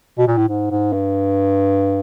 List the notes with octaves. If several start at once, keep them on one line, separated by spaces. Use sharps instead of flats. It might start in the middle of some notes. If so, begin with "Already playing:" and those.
B2
A#2
A2
G#2
G#2
G2